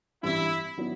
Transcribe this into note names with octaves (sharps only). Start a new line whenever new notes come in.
G2 E3 G3 C4 E4
D#3 F#3 B3 E4